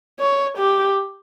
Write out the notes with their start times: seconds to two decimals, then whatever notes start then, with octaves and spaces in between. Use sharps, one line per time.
0.20 C#5
0.58 G4